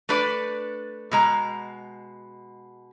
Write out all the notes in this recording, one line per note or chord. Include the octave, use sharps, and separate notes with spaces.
A3 D4 B4 D5
B2 G#3 A#5